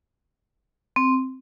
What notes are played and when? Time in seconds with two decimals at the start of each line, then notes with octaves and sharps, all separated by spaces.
0.96 C4